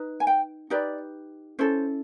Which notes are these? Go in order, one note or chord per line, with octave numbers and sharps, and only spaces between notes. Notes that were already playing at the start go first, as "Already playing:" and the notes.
Already playing: D#4 B4
G#5
G5
D#4 G4 B4 D5
C#4 E4 A4 C5